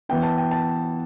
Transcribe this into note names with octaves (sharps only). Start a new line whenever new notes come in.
E3 B3 E4 G5
A5
G5
A5